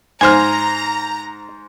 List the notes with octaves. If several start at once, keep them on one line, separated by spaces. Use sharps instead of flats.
G#2 C5 G#5 A#5 F6